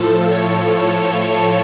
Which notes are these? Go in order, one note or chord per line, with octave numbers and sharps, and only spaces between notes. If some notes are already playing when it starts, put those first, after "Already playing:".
Already playing: A2 F3 A4
C#5